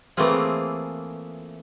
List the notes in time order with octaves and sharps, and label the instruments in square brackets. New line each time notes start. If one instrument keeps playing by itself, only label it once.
[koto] E3 A3 A#3 C4 F4 G#4